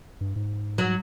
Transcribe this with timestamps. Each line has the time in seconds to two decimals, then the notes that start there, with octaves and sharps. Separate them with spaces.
0.21 G2
0.36 G#2
0.78 F#3